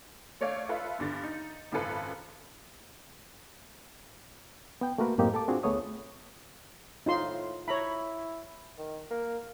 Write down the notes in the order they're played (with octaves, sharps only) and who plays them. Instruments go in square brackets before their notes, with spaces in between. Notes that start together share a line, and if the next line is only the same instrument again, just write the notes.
[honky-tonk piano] A3 C#5 D5 F5
F4 A4 B4 E5
E2 G2 D3 A6
D#4
G#1 F#2 C#3 F4 A4 B4
[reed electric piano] B3 G5
A3 A#3 F#4 A#4 B4
F#2 A2 A#3 C4 G4 D#5
A4 A5 D6
C4 D4 F4 F#4 G#4
D2 A3 B3 G#4 C#5 D#6
[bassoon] A2 [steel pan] D#4 F4 C6
[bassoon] E4 [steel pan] C#5 A#5 B5
[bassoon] D#3
A#3